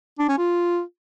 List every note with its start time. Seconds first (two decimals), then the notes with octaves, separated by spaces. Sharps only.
0.19 D4
0.29 C#4
0.38 F4